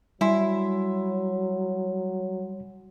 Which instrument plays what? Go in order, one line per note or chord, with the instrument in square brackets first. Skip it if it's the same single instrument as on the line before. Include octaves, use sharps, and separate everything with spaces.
[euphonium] F#3 [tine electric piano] G3 G#5 C6 [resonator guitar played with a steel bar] E4